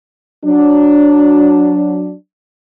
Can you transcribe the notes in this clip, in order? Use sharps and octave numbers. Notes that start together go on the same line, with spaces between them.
F#3 D4